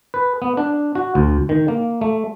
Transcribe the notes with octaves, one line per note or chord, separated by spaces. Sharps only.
B4
B3
D4
F#4
D2
D#3
A#3
A3